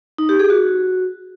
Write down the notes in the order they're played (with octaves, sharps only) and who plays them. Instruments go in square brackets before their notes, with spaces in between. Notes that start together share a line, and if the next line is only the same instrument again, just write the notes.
[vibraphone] D#4
G4
G#4
F#4